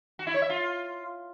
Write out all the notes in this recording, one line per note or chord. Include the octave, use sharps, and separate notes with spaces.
F#4
E4
C#5
E5
F4